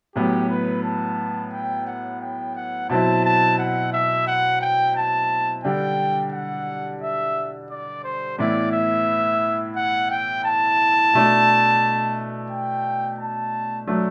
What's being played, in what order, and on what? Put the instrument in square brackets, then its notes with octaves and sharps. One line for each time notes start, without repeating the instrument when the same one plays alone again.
[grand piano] A2 F#3 B3 [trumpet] G4
[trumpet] B4
A5
G5
F#5
G5
F#5
[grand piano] B2 F#3 C4 E4 [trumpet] A5
[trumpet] A5
F#5
E5
F#5
G5
A5
[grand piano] D3 G3 D4 [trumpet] G5
[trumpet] F#5
E5
D5
C5
[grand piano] A2 E3 B3 E4 [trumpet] D5
[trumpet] E5
F#5
G5
A5
[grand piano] B2 A3 D4
[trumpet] G5
A5
[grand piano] F#3 A3 D4